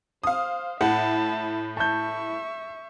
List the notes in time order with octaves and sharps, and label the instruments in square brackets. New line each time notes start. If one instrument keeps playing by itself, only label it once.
[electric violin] C5 [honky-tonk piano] F5 D#6
[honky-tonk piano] A2 [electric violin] E5 A5 [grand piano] F#5
[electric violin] E5 C#6 [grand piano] A5 G6